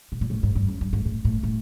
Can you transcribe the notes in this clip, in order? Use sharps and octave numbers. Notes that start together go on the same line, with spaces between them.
B2
A#2
A2
G#2
G2
F#2
G2
G#2
A2
A2
A2